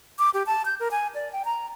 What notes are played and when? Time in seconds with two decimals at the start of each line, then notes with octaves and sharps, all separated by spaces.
0.19 D6
0.34 G4
0.47 A5
0.65 G6
0.80 A#4
0.91 G#5
1.15 D5
1.32 G5
1.45 A#5